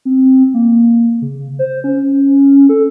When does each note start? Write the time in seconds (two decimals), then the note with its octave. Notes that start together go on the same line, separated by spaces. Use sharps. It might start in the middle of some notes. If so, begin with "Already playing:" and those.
0.05 C4
0.54 A#3
1.22 C#3
1.59 C5
1.84 C#4
2.69 A4